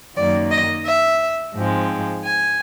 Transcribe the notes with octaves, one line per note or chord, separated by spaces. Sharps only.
F#2 D#3 F#3 A#3 D5
D#5
E5
G#2 F3 G#3 C4
G#5